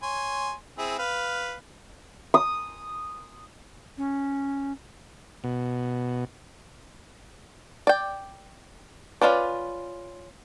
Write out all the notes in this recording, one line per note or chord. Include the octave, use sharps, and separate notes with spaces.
C#5 G#5 C6
C4 E4 G#4
B4 F5
D#6
C#4
B2
D5 G5
C#4 E4 F4 B4 D5